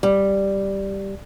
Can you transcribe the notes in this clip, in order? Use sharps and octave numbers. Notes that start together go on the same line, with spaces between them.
G3